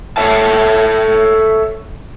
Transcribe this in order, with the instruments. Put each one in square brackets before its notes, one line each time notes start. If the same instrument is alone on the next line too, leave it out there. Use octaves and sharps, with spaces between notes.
[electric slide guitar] A4 C#5 E5 A5